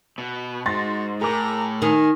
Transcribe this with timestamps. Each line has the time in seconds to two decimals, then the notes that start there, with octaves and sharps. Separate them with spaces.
0.18 B2
0.66 G#2 F#4 C6 A6 A#6
1.21 A2 G#4 A#4 A#5 D6
1.82 D#3 G#5